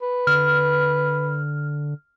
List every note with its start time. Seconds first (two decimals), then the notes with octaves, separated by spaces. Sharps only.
0.02 B4
0.27 D3 F6